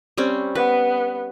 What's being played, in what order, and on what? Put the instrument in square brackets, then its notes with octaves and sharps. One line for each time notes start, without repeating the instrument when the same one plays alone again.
[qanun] G3 C4 C#4
[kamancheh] B3 [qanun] B4